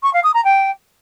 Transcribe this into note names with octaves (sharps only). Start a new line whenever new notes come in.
C#6
F5
D#6
A#5
G5